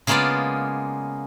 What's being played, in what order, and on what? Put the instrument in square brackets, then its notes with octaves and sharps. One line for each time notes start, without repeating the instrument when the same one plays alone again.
[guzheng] C#3 G#3 A#3 B3 F4 D5